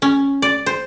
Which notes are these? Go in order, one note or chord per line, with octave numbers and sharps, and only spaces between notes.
C#4
D5
C5